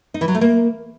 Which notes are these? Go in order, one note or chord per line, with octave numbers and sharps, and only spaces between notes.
D#4
E3
F#3
A3
A#3